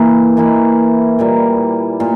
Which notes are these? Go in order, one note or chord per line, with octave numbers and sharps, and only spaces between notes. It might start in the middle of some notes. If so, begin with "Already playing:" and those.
Already playing: E3 A#3 E4
E3 A#3 E4
A#2 G3 A#3
A#2